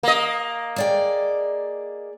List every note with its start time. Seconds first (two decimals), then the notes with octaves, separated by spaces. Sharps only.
0.03 A#3 D#5
0.76 G#4 D5 G5